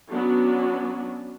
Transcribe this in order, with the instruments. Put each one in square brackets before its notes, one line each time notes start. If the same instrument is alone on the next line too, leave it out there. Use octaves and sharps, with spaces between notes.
[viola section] F#3 B3 C#4 D4 F#4